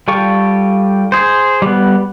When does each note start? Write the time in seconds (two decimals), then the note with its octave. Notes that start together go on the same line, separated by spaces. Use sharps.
0.08 G3 F4 A4 G5 C#6
1.12 G#4 C5
1.62 G3 B3